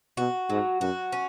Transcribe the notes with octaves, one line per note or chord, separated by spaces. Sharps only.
B2 F#4
G#2 F#3
F#2 F#4
C#4